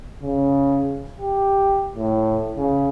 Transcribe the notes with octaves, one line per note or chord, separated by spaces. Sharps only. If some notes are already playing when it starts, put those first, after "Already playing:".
C#3
G4
A2
C#3